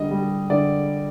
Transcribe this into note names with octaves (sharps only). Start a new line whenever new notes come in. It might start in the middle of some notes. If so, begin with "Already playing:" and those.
Already playing: D3 G3 D#5
G3
D3 D5